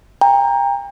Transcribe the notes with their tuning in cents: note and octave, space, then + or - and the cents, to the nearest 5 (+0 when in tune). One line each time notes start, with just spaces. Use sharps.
G5 +35 A#5 +0